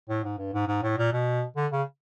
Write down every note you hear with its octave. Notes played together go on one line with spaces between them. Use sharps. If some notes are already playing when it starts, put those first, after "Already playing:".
A2
G#2
G2
G#2
G#2
A2
A#2
B2
D3
C#3